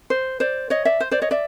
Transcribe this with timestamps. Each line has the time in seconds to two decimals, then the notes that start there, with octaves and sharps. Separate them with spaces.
0.10 C5
0.40 C5 D5
0.70 C#5 D#5
0.85 D5 E5
1.00 C5
1.11 C5 D5
1.22 C#5 D#5
1.31 D5 E5